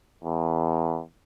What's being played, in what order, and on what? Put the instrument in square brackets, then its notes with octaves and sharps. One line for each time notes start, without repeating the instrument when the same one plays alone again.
[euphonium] E2